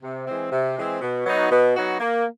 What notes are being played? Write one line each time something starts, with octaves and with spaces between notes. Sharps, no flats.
C3
E3 G#3 C4
C3
E3 G#3 C4
B2
F#3 B3 D#4 F#4
B2
F#3 B3 D#4 F#4
A#3